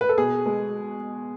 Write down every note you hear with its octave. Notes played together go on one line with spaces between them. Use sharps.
B4
A4
B2 G#4
G#3